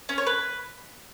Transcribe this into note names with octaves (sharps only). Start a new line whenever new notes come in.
C#4
C#5
B4